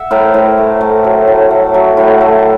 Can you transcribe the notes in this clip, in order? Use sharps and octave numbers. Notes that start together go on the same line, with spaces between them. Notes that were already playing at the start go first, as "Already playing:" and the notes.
Already playing: E5 F#5
A2 A#4 C5
A2
A3
A3
F#3
A2
A3
F#3
A2
A3